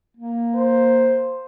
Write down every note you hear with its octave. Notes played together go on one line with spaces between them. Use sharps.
A#3
C5